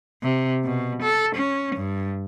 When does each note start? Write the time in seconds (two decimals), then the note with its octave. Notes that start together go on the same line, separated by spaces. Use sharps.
0.23 C3
0.65 B2
1.02 A4
1.35 C#4
1.76 G2